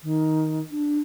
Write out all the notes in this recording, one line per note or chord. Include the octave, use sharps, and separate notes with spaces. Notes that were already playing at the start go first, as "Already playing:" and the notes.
D#3
D4